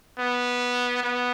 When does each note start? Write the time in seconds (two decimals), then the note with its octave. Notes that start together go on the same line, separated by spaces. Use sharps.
0.19 B3
1.03 B3